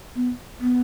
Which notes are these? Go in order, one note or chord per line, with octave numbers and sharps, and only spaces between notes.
B3
B3